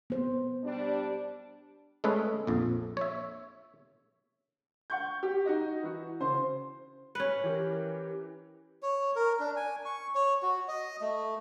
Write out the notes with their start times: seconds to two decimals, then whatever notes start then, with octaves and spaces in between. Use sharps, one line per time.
0.10 B3 C5
0.64 G3 D4
2.04 G#3 A3 C#4 G#4 A4 B4
2.47 A#1 F2
2.97 C#5 E5
4.90 F#5 C#6 G6
5.23 G4
5.46 D#4 F#4 D#5
5.83 E3 F#4
6.20 C#3 C5 C6
7.15 C#4 B4
7.44 E3 G4 A#4
8.83 C#5
9.16 A#4
9.40 D4
9.56 G#5
9.85 C#6
10.15 C#5
10.43 F#4
10.68 D#5
11.01 A3